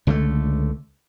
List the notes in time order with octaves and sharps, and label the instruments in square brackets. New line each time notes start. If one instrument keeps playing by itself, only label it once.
[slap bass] C#2 D3 G#3 A3